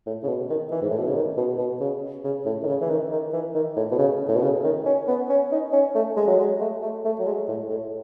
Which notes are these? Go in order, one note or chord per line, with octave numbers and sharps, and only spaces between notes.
A2
C#3
B2
D#3
E3
G#2
A2
B2
C#3
D#3
B2
B2
C#3
C#3
A2
D#3
C#3
E3
D#3
D#3
E3
D#3
A2
B2
C#3
A2
B2
C#3
D#3
C#4
B3
C#4
D#4
C#4
A3
G#3
F#3
G#3
A3
A3
A3
F#3
G#3
A2
A2